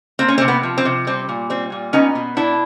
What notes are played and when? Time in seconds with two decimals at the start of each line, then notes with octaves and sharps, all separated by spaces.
0.19 A#3 C4
0.28 C#4
0.38 C4
0.41 C3
0.48 B3
0.63 F3
0.78 C4
0.85 C3
1.07 G3 C4
1.29 A#2
1.50 G3 C4
1.72 A#2
1.93 B3 C#4 D#4
2.15 B2
2.37 B3 D4 E4